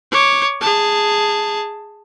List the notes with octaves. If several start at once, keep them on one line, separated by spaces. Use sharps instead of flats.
C#5 D6
G#4 A5